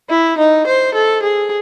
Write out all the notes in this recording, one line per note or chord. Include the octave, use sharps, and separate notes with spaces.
E4
D#4
C5
A4
G#4